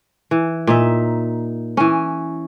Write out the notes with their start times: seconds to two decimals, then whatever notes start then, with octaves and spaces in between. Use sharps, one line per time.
0.31 E3
0.67 A#2 D#4 E5
1.77 E3 C#4